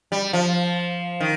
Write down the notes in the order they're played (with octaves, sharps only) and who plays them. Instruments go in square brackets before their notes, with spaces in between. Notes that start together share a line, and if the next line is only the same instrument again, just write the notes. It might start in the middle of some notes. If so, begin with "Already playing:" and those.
[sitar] G3
F3
D#3